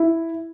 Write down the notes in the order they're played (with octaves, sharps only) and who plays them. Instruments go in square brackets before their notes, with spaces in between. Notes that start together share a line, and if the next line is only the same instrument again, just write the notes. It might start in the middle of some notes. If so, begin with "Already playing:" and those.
Already playing: [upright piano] E4